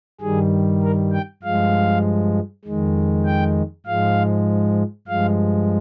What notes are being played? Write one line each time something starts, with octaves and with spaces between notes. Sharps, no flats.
G2 D#3 G3 G#4
A#4
G5
G2 F3 G#3 F5
F2 D#3 G#3
G5
G#2 F3 G#3 F5
G2 F3 G#3 F5